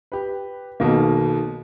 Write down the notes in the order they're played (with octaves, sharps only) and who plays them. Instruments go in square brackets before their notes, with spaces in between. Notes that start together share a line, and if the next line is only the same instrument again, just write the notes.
[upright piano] G4 B4
B1 B2 D#3 A#3